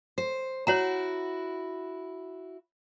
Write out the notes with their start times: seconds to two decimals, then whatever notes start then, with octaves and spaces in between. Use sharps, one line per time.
0.18 C5
0.67 E4 F#4 C#5 F#5 A#5